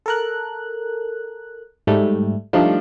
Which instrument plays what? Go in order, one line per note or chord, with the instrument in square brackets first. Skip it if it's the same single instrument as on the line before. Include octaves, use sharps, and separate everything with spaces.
[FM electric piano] A4 A#4 F#6
G#2 G3 A3
[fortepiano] F3 D4 F4 [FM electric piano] G3 A3 D#4